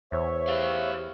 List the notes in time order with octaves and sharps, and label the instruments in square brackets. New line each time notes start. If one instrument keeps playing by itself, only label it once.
[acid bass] E2 [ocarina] C5 [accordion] C#5 E5
[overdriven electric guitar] G4 F5